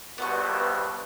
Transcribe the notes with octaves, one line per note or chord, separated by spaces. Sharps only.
A#1 G2 B2 B3 C5 C#6